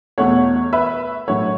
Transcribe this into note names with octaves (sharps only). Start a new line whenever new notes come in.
E2 B2 A3 C#5 F#5
B4 E5
A2 F#3 A3 C#5 F#5